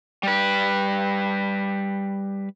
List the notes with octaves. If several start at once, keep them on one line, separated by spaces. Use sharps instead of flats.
G3 B4